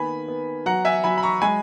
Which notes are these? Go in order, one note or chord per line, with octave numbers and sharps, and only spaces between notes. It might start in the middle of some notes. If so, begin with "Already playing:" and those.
Already playing: D#3 A#3 B3 G#5 B5
B3
F#3 F#5 A#5
E5 G#5
F#3 G#5 B5
B5
A#5 C#6
G#3 G#5 B5